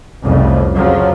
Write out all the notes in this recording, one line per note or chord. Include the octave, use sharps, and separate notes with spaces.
F1 C2 F2 C#3
F2 C#3 F3 F#3